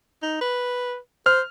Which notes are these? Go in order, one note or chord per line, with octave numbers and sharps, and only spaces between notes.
D#4
B4
C5 F6